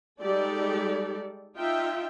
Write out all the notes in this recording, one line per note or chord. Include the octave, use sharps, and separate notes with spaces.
G3 G#3 D#4 G4 A4 D5
D#4 F4 E5 G5